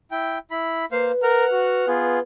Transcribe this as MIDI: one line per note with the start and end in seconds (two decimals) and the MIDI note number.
0.11 0.38 64
0.11 0.38 79
0.51 0.85 64
0.51 0.85 83
0.92 1.12 58
0.92 2.22 71
0.92 1.12 72
0.92 1.12 77
1.23 1.45 70
1.23 1.87 78
1.23 1.87 89
1.52 1.83 66
1.88 2.19 59
1.88 2.19 65
1.88 2.19 68